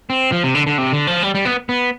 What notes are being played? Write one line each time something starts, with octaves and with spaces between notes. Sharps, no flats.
C4
F3
C3
D3
D3
C3
D3
F3
G3
G3
B3
B3